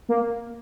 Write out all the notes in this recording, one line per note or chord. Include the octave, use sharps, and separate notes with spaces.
A#3